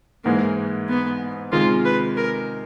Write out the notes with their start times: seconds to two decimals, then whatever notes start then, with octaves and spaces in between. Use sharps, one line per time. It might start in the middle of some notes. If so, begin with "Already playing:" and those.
0.25 G#2 E3 G#3 A#3
0.89 B3
1.52 C3 D#3 G#3 F4
1.85 B4
2.17 A#4